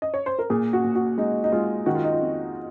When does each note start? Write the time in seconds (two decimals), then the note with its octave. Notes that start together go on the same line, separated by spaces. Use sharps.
0.02 D#5
0.14 C#5
0.26 C5
0.39 A#4
0.50 A#2 G#4
0.73 F#4
0.84 A#2
0.95 F#4
1.18 G#3 D#4
1.44 D#4
1.52 G#3 F4
1.86 D#3 F#4
1.95 F4
2.04 D#4
2.12 F4
2.21 F2